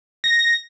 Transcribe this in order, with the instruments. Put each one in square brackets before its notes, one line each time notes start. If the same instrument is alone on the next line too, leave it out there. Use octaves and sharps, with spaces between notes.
[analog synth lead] A#6